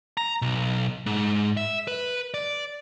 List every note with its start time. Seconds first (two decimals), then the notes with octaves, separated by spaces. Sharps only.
0.17 A#5
0.42 B1
1.06 G#2
1.57 E5
1.87 B4
2.34 D5